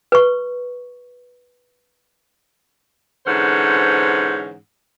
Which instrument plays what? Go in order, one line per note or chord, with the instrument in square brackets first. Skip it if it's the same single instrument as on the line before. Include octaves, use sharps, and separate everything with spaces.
[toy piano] B4 C#6
[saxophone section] G#2 D3 E3 C#4 C5 F#5